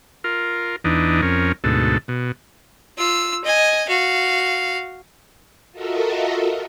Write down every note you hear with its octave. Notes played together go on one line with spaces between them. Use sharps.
F4 A#4
E2 E3 D4 D#4
F2 C#4 A#4
D2 G#2 B2 A4
B2
F4 E6
D#5 G#5
F#4 F5
F4 F#4 A4 A#4 D#5 E5